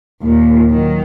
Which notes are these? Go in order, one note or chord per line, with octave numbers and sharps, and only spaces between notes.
D#2 A#2
D#3 F#3